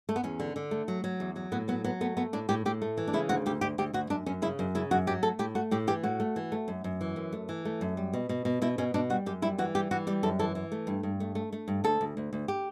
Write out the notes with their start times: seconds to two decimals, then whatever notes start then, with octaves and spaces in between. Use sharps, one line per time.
0.09 A3
0.16 B3
0.23 E2 C#4
0.40 D3
0.56 D3
0.71 A3
0.88 F#3
1.04 F#3
1.20 E2
1.36 F#3
1.52 A2 B3
1.68 F#3 B3
1.84 F#3 B3
2.01 A3 B3
2.17 A3 B3
2.33 A2 D4
2.49 A2 G4
2.65 A2 G4
2.82 A3
2.97 E3
3.08 D4
3.13 C#3 E4
3.29 D2 F#4
3.46 D2 G4
3.61 D2 G4
3.78 D2 G4
3.93 D2 F#4
4.10 F#2 D4
4.26 F#2 C#4
4.42 C#3 E4
4.59 F#2
4.75 C#3 E4
4.91 F#2 F#4
5.07 F#3 G4
5.23 A3 A4
5.39 A2 G4
5.55 A3 F#4
5.71 A2 G4
5.87 E3 G4
6.03 A2 F#4
6.20 A3
6.36 E3
6.52 A3
6.68 F#2
6.84 F#2
7.01 E3
7.16 F#2
7.32 A3
7.49 E3
7.65 A3
7.81 F#2
7.97 G3
8.13 B2
8.29 B2
8.45 B2
8.62 B2 E4
8.78 B2 C#4
8.94 B2 D4
9.10 G3 F#4
9.26 F#2 G4
9.42 G3 E4
9.58 E3 F#4
9.75 G3 G4
9.91 E3 F#4
10.07 G3 G4
10.23 F#2 A4
10.39 E3 A4
10.55 E3
10.72 A3
10.87 G2
11.03 G2
11.20 A3
11.35 A3
11.52 A3
11.68 G2
11.84 D2 A4
12.01 D2
12.17 D2
12.33 D2
12.48 G4